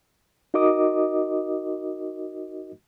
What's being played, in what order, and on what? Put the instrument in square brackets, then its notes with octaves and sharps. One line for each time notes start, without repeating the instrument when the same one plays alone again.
[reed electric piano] D#4 F#4 A#4 D#5 D6 D#6